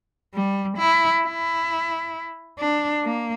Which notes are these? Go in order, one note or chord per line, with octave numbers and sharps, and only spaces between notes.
G3
E4
E4
D4
A#3